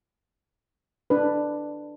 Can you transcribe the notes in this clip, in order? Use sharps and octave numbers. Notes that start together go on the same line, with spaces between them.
D4 B4